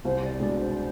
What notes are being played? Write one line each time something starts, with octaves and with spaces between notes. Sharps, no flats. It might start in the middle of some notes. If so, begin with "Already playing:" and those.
C2 C5
D5
B2 G#3 D4 D5
C5